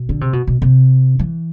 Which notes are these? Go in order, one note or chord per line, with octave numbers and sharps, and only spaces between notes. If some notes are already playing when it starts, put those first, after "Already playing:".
Already playing: B2
D3
C3
B2
B2
C3
E3